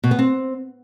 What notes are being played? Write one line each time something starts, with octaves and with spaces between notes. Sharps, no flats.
B2
B3
C4